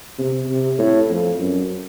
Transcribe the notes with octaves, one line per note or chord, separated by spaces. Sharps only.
C3
C3
A2
F2
F#2